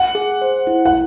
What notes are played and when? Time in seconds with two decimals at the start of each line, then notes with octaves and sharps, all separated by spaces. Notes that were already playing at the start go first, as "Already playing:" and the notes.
Already playing: F#5
0.15 G#4
0.42 C5
0.67 E4
0.85 F#5